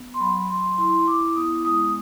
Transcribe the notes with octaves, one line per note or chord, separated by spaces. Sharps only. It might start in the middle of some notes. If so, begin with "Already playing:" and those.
Already playing: B3
C6
F#3 B5
F#3 C6
E4 C6
E4 D6
B3 D#6
G#3 D#6